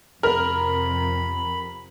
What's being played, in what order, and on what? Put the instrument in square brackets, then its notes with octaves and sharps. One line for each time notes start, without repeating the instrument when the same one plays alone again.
[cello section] F2 C3 [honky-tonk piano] A#4 F6 [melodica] B5